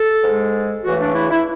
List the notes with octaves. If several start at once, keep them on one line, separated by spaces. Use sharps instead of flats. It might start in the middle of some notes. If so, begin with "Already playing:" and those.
Already playing: A4
G#2 G#3
E2 C#3 E3 A3 F#4
D4
E4
E4